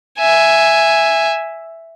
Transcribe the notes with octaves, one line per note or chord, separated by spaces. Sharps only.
E5 G#5